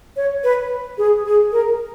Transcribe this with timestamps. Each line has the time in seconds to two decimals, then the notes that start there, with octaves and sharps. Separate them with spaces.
0.16 C#5
0.44 B4
0.98 G#4
1.25 G#4
1.52 A#4